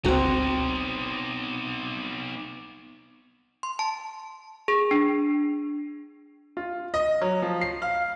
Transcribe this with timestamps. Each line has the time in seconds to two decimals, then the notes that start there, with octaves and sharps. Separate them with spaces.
0.04 G1 C#2 B3 C4 D#4 F#4 A#5
3.63 C6
3.79 A5
4.68 G#4
4.91 D4
6.57 F4
6.94 D#5
7.22 F#3
7.42 F3
7.61 C7
7.82 F5